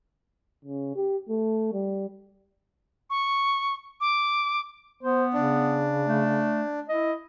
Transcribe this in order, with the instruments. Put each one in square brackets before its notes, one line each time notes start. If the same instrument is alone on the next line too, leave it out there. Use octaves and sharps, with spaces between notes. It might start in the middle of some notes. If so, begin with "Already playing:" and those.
[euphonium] C#3
G4
A3
G3
[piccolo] C#6
D6
[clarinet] B3 [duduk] C5
[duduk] C#3 [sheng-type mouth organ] D4
[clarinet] A3
[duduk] E4 [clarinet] D#5